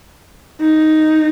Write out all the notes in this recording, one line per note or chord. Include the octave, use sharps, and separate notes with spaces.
D#4